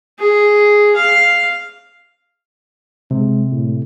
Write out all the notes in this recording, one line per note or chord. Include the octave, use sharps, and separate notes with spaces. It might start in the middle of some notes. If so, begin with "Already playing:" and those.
G#4
F5
C3 G#3
A2